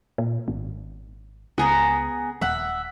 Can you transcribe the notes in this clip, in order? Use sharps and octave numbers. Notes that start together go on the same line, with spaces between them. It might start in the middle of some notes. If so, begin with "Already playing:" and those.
A#2
G#1
C#2 B3 G#4 A#5
D#1 E5 F#5